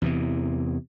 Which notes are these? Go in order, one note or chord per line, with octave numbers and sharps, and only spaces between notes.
E2 C3 E3